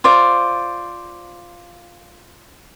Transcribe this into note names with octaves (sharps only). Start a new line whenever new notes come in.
F4 C5 D5